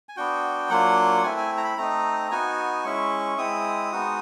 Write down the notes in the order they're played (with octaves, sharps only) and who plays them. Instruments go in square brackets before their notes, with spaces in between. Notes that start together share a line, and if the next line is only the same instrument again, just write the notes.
[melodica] G#5
B3 D4 F#4 G5
F#3 A#3 D4 F4 F#5
A3 C4 E4 G#5
G#5
A#5
B5
A3 C4 D#4 A#5
B3 D#4 F#4 G#5
G#3 C#4 E4 C#6
G#3 C4 E4 D#6
G#3 B3 D#4 F#4